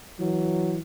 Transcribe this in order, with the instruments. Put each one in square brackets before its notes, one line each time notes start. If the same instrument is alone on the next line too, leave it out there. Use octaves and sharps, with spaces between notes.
[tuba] E3 [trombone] F#3